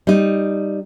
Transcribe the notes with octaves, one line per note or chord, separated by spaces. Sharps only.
G3 D#4